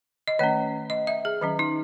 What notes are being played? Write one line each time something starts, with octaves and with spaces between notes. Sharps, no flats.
D#5
D#3 A3 C#4 C#5
D#5
E5
G#4
D#3 F#3 C#4
D#4